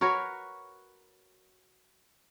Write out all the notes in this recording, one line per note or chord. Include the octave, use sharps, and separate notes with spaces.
F#4 A#4 B4 C#5